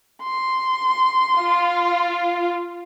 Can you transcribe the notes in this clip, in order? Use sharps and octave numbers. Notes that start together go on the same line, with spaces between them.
C6
F4